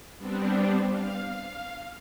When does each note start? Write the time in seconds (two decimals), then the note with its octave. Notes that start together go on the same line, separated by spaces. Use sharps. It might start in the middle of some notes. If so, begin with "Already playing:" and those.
0.18 G3 B3 C4 D4
0.89 F5